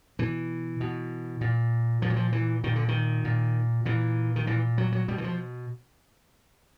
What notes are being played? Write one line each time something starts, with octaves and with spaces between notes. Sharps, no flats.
B2 E3
B2
A#2
A#2 F3
F#3
F3
E3
A#2 D#3
D3
D#3
A#2
A#2 E3
D#3
A#2 E3
F#3
F#3
B2 G3
E3
F3